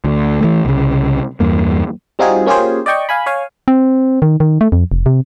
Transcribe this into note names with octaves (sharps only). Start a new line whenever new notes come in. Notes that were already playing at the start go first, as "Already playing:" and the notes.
D2
E3 A3
C2 C#3
E2 G2 A#3
G3 C4 D#4 F4 F#4 G#4
A#3 C#4 F4 G4 G#4 C5
D5 D#5 G5 C#6
F5 G#5 B5
C#5 F5 G#5
C4
D#3
D#3
A3
F2
F1
C3